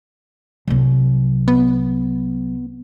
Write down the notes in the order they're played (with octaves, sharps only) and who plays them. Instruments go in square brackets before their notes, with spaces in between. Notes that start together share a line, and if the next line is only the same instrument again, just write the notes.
[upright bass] C2 F#3
[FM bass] B3